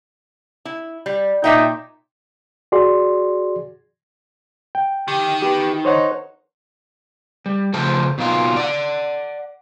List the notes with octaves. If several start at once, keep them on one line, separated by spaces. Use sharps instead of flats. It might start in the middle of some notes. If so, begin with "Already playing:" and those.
E4
G3
A#2 D#4 E5 G5
F#4 G#4 D5 C6
G5
D#3 G4
B3 G4
D#4 C5 C#5 F#5
G3
C#3 F3 A3 A4 C5
B2 D#3 F#3 A#3 E4 F4
D5 F#5